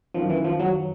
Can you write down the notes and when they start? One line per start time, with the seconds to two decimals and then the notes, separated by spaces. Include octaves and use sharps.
0.14 F#2 D#3 F3
0.30 E3
0.44 F3
0.60 F#3